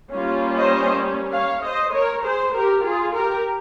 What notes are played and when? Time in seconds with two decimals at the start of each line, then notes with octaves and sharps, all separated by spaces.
0.11 G3 A#3 C#4 F4
0.56 C5 D#5
1.32 C#5 F5
1.63 C5 D#5
1.93 A#4 C#5
2.23 G#4 C5
2.54 G4 A#4
2.84 F4 G#4
3.15 G4 A#4